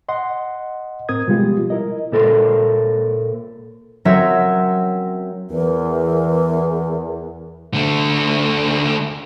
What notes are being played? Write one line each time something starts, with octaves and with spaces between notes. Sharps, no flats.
D#5 F#5 C6
A2 C4 A#4 D#6 G#6
B2 F3 G3 G#3 F4 G4
E4 A#4 D#5
A#2 A4 A#4 C5
F#3 C4 C#4 A#4 E5
E2 E3 A#4
D3 A3